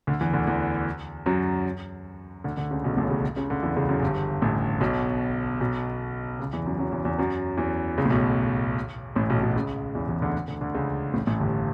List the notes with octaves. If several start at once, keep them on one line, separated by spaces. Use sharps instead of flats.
D2 D3
E2 E3
D2 D3
E2 E3
F#2 F#3
D2 D3
D2 D3
C#2 C#3
B1 B2
A1 A2
C#2 C#3
C#2 C#3
D2 D3
E2 E3
C#2 C#3
F#2
G1 G2
A1 A2
B1 B2
B1 B2
C#2 C#3
E2 E3
F#2 F#3
F#2 F#3
E2 E3
E2 E3
F#2 F#3
E2 E3
C#2 C#3
A2
B1 B2
A1 A2
B1 B2
B1 B2
C#2 C#3
E2 E3
E2 E3
D2 D3
D2 D3
D2 D3
C#2 C#3
A1 A2
A1 A2
G1 G2